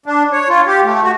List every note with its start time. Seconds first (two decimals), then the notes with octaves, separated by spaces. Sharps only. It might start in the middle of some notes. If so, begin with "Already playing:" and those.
0.06 D4
0.33 C#5
0.49 F4
0.67 G4
0.84 A3
1.03 F#4